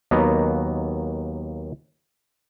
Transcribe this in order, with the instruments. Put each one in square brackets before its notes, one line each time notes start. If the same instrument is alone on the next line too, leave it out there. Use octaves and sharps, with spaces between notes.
[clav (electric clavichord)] D#2 F#3 A#3 B3 D#5 A#5